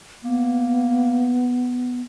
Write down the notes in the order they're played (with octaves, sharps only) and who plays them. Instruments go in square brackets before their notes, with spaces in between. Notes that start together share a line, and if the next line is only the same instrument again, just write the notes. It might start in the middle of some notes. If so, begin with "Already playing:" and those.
[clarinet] A#3 [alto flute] B3